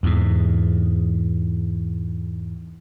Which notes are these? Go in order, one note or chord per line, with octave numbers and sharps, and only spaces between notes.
E2 G#2